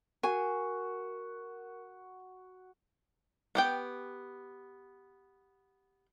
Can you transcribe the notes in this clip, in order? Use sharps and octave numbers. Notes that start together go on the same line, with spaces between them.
F#4 A#4 G#5
B3 G4 G5